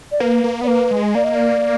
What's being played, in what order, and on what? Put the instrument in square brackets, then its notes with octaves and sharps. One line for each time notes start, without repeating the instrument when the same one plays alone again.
[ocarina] D5
[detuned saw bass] A#3 [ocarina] B4
[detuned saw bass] A#3
[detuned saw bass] B3 [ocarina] D5
[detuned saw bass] A#3 [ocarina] B4
[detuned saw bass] G#3
[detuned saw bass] A#3 [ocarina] D5
[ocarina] D#5
D5